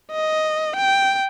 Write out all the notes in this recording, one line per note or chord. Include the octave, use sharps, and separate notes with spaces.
D#5
G5